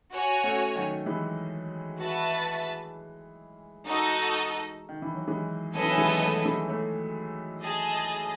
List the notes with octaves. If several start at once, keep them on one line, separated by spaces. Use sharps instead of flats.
F#4 C#5 G#5
A3 C#4
D#3 F#3
E3 G#3
F#4 B4 E5 A5
D#4 F#4 A4 D#5
D#3
E3
F#3
E3 G#3
F#3 B3 E4 A4 D#5 G#5
E3
D#3 F#3
E3 G#3
F#3 A3
E3 G#3
F#3 A3
G#4 D#5 A5